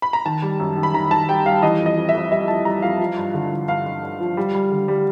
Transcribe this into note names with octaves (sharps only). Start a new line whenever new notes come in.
B5
A#5
D#3 A5
G3
F#2
D#3
B5
D#3 A#5
D#3 A5
G3 G5
G3 F5
E3 D#5
F2
D#5
F2
E5
F2
G3 E5
F2 A5
G3 A#5
F2 F5
F3
G2
D3
G2
G2 F5
G2
G2
F3
G3
G3
D3
G3